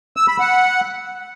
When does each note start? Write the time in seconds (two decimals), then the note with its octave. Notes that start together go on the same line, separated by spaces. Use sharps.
0.17 E6
0.28 B5
0.40 F#5